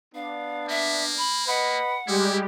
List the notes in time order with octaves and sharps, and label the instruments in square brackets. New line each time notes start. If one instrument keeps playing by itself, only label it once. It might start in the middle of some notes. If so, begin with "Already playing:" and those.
[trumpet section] B3 D4 [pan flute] F5
[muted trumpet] A#3 [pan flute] E5
[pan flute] B5
[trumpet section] B4 D#5 B5 [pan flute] F#5
[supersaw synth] G3 G4 [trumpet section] G#3 [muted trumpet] E4